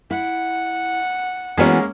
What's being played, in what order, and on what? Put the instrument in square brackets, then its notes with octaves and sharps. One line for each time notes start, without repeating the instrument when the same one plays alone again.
[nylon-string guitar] E4 [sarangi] F#5
[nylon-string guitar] E3 B3 F#4 [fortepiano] G#3 A#3 C#4